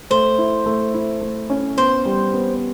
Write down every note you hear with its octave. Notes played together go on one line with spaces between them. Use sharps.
A3 C5
E4
A3
E4
A3
C#4
B3 C5
G3
B3